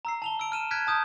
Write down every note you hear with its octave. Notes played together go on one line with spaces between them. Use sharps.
A#5 E6 C7
A5 F7 G7
E6 D7
F6 D#7 E7
F6 F#6 G#6 B6 D7
A5 D#6 G6